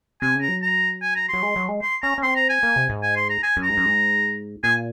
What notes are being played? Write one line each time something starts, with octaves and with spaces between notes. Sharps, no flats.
C3 G#5
C#3
A#5
F#3
A#5
G#5
A#5
F#3 C6
G#3
F#3
G#3
C6
C#4 A#5
C#4
C4 C6
A#5
G#5
A#3
C3
G#2
G#5
C6
A#5
G#5
F#2
A#5
G#2
F#2
G#2
A#2 G#5